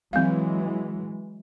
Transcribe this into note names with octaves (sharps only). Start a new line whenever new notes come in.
E3 F#3 G#3 C4 F5